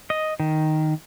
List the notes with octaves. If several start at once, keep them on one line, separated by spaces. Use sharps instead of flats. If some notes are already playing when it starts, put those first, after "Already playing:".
D#5
D#3